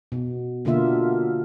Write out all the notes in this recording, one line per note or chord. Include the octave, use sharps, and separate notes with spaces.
B2
B2 D3 A#3 F4 E5